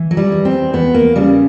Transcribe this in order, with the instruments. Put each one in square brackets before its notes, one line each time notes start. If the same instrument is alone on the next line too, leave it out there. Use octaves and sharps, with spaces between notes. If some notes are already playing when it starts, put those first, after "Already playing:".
Already playing: [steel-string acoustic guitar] E3
F#3
G3
E2
C4
E2 B3
A#3
C#3 G3